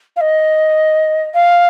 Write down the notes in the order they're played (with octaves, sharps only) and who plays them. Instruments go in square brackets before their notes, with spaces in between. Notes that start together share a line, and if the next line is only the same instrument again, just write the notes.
[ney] F5
D#5
F5